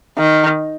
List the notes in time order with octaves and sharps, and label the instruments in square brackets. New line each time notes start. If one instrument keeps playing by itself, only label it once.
[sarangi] D#3